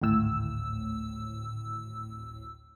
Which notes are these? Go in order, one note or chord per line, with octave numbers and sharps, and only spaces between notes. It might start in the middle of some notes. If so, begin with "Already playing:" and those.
G#1 D2 A2 E6